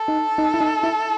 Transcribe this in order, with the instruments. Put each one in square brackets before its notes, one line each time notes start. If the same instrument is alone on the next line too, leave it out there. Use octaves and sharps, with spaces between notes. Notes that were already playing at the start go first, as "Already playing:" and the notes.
Already playing: [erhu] A4
[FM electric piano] D#4
D#4
E4
D#4
E4